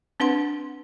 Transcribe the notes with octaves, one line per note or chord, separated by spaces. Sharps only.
C4 D4 B4 F#5 C6